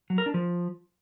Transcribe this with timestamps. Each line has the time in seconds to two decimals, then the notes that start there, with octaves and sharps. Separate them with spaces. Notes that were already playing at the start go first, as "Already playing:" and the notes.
0.10 F#3
0.18 A#4
0.26 D4
0.34 F3